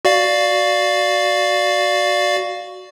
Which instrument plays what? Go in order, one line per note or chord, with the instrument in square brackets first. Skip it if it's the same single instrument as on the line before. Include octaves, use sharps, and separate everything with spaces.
[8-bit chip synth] F#4 D5 F5